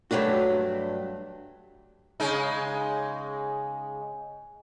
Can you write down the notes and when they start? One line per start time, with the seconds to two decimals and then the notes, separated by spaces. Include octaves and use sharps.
0.11 G2 F#3 A3 D4 F#4
2.20 C#3 G#3 D#4